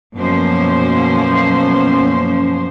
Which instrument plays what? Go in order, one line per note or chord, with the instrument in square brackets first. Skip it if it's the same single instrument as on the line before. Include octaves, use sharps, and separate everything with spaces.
[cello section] F#2 B2 F3 A#3 C#4 C5